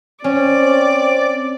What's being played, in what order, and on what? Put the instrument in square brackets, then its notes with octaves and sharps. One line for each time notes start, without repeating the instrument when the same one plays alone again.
[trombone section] C4 [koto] C#4 [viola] D5